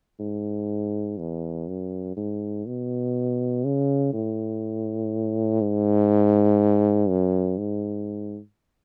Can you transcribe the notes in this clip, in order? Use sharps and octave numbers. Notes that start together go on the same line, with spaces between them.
G#2
E2
F#2
G#2
B2
C#3
A2
G#2
F#2
G#2